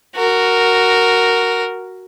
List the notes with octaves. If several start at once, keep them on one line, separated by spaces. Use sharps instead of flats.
F#4 A#4